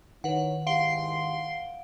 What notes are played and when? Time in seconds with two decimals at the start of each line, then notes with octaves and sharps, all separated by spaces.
0.24 D#3 D#4 E4 B4 C#5 F#5
0.67 G#2 E4 G4 F5 F#5 C6 D7